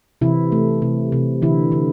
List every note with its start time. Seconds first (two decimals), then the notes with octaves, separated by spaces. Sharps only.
0.21 C3 E3 E4
0.52 A3
0.82 C3
1.12 C3
1.42 D3 E3 E4
1.72 D3